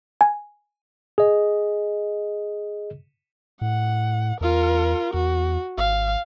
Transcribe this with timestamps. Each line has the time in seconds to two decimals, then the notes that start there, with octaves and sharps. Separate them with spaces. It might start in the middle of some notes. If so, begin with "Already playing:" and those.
0.21 G#5
1.18 G#4 D#5
3.61 A2 F#5
4.41 E2 F4 A#4
5.14 E2 F#4
5.78 G#1 F5